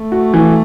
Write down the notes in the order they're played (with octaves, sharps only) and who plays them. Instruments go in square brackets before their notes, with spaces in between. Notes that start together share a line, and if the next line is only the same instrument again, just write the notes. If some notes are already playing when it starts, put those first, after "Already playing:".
Already playing: [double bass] A3
[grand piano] F#4
E3